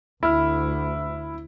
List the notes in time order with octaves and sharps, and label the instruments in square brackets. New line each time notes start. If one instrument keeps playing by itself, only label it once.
[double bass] D2 [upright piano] E4 [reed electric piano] B5 F6